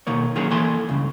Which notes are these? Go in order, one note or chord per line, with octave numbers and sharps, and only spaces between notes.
B2 D#3 A#3 C#5
D#3 F#3 A#3 C#4 G#4
E3 A#3 E4 A4 G#5 C6
C#2 G2 C#3